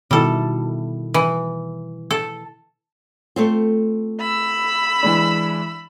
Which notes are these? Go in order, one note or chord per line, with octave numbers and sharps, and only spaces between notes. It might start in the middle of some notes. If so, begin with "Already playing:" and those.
B2 D#3 G3 E4 A4
E3
A4
A3 C4 F4
B5 E6
E3 G#3 D4